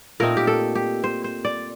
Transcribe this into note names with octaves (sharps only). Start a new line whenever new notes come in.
A#2 A3 C4 D#4 A#4
G4
A4
G4
C5
C5
D5